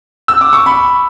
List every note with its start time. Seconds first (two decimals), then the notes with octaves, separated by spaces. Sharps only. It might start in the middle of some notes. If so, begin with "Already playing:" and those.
0.28 E6
0.41 D6
0.53 C#6
0.66 B5